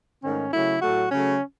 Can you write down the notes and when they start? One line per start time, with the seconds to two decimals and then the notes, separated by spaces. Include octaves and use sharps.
0.23 G#2 D#3 A3 C#4
0.52 C#3 F#3 A3 E4
0.82 A2 F#3 A3 F#4
1.11 C#3 F#3 A3 C#4